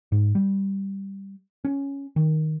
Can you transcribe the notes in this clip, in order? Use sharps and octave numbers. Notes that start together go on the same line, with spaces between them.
G#2
G3
C#4
D#3